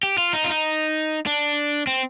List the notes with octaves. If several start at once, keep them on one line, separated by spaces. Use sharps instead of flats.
G4
F4
D#4
F4
D#4
D4
C4